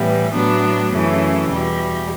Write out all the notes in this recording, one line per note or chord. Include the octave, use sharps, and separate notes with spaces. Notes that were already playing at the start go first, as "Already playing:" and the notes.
Already playing: A2 E3 G3 B3
A2 F#3 B3 D4
F#2 C#3 E3 A3
E2 B2 G3